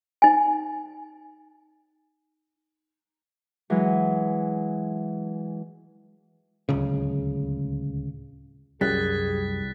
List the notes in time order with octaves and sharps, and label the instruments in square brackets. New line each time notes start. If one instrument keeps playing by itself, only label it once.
[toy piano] D#4 G#5
[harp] E3 F#3 G#3
[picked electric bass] D1 C#2 C#3
[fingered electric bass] C2 G3 [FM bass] F#2 [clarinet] G#4 [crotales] F#6 A6 B6